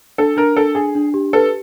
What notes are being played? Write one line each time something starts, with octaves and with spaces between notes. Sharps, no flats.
D4 A4
D4 A#4
D4 A4
D4 G#4
D4
G4
A4 B4